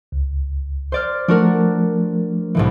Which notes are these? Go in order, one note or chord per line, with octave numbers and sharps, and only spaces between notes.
C#2
C5 D5 F6
F3 A3 D4 F#4 A#4
C2 A2 E3